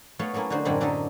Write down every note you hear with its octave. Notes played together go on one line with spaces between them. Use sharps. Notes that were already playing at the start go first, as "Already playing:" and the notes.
A3 B3 C#5 F5
F#3 A3 A#3 C#4 E4
D3 D#4 F#4 C5
F#2 A2 D3 G#3 C4 B5
D3 F#3 D4 D#4 A4 D#5